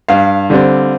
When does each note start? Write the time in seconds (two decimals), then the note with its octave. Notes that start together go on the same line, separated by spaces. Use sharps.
0.08 G2 F5
0.50 D3 G3 C4